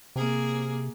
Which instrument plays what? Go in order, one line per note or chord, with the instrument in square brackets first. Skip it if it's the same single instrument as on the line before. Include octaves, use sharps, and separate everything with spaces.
[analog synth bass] C3 [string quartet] A#3 G#4